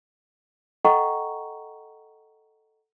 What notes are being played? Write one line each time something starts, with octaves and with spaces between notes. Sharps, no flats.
A4 D#5 F#5 G5 A#5 C#6